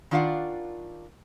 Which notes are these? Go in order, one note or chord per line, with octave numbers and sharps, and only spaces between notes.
D#3 D4 F4 D5 F5 F#5